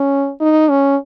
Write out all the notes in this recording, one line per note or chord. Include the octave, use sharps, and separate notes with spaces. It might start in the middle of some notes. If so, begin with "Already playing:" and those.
Already playing: C#4
D#4
C#4